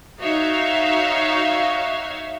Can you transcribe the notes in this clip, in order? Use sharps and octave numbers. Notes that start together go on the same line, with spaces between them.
D#4 F#4 C#5 E5 F5